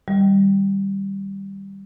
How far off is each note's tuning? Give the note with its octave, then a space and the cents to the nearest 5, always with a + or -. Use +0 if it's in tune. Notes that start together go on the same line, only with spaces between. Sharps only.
D#3 +0 G3 +0